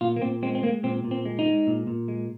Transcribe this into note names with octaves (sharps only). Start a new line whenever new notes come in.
A#2 F4
A#3
A#2 C4
G#3 C4
C4
G#3 A#3
A#2 C4
A#2
C4
G#3
D#4
G#3
A#2
A#2
G#3